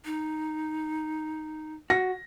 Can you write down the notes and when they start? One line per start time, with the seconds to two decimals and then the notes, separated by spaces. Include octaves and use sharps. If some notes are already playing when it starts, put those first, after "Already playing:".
0.05 D#4
1.90 F#4 A#6